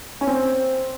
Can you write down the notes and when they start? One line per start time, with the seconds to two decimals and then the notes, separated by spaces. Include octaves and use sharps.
0.21 C#4
0.27 C4